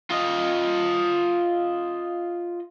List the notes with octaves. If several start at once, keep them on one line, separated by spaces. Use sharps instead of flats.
F4 D#5